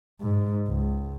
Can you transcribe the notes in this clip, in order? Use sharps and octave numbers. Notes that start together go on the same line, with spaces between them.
G#2
C#2